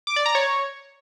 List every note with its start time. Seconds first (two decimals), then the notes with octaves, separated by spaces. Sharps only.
0.07 D6
0.16 D5
0.26 A#5
0.35 C#5